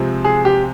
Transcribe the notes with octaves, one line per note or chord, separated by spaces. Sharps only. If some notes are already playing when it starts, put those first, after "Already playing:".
Already playing: C3 F3 G#3 C4
G#4
G4